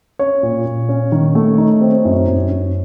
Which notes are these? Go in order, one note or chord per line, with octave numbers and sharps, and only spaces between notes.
C#4 C#5
A#2
A#2
C#4
D#3
A3
D#4
C4
F#2
F#2
F#2